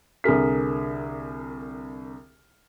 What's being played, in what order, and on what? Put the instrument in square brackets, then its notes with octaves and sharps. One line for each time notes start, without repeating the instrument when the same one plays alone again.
[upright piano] C2 D3 G#4 A#4 B6